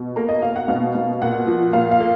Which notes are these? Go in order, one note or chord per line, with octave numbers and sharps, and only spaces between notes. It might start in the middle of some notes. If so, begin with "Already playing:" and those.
Already playing: B2
A#3 A#5
D#5
A#3 F5
F#5
B2 F5
B2
A#2 F#5
F3
A#2 F5
F5
A#3